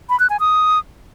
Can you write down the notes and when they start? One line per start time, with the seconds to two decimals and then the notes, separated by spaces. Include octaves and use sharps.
0.09 B5
0.20 F#6
0.30 G#5
0.40 D#6